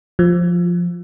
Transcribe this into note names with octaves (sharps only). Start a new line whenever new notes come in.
F3